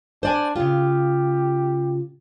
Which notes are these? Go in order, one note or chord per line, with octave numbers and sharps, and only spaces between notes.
D4 C5 D5 G#5
C#3 F4 G4